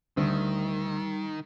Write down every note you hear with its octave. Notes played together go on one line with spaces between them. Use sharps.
D2 D#3 G3